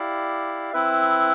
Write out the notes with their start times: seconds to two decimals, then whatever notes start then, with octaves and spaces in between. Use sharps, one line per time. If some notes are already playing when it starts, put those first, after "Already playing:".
Already playing: E4 G4 D5 F5
0.73 C4 E4 B4 E5